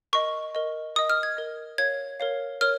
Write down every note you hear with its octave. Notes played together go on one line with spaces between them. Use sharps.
A#4 D#5 C#6
A#4 D#5
A#4 D#5 D#6
F6
G#6
A#4 D#5
A#4 C#5 F5 G#6
A#4 C#5 F5
A#4 C#5 F6